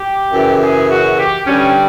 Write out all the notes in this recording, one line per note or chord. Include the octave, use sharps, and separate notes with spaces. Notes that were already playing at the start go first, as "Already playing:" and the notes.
Already playing: G4
F#2 C#3 E3
G#4
F#4
G4
G2 D3 G3 C#4